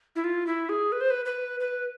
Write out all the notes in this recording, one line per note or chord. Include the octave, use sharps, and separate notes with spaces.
E4
F4
E4
G#4
B4
C5
B4
B4
B4